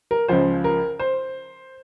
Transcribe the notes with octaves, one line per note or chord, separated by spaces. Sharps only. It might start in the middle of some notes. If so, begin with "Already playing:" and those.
A#4
C#2 C#3 F3 C5
A#4
C5